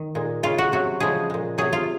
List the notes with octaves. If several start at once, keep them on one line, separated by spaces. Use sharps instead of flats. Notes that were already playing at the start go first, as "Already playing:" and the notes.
Already playing: D#3
A#2 G#3
C#3 G#3 F4
F#4
C3 F#3 F#4
C#3 F3 G#3 G#4
A#2 G#3
C3 F#3 G#4
F4